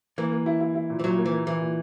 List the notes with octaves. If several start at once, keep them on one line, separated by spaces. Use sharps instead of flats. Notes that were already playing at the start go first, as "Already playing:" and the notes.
E3 A#3
A#3
E4
E4
E4
A#2
E3
A#2 F#3
A#3
E3
A#3
E3 E4
A#2